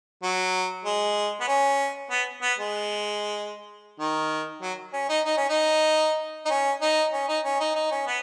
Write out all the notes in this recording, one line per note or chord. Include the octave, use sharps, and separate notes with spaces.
F#3
G#3
B3
C#4
B3
B3
G#3
D#3
F#3
C#4
D#4
D#4
C#4
D#4
D#4
C#4
D#4
C#4
D#4
C#4
D#4
D#4
C#4
B3